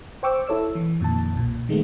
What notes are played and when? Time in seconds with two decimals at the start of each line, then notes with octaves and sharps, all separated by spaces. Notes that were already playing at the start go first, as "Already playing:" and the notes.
0.23 C5 G5 C#6 D6 E6
0.47 E4 A4 C#5 E6
0.75 E3
1.01 F2 A#2 D#3 A5
1.35 B1 A#2
1.69 D#3 G#3 A3 B3